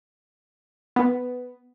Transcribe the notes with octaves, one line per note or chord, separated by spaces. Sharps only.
B3